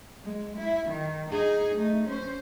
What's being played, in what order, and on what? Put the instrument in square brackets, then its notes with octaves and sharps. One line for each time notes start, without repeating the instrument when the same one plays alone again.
[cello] G#3
E4
D#3
D#4 G#4
A3 D#4
C#4 C5